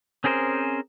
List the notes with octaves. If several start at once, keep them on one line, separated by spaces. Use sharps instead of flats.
C4 C#4 G#4 A#4 C5